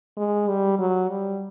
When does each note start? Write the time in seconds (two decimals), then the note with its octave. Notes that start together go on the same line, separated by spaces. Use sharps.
0.17 G#3
0.48 G3
0.79 F#3
1.09 G3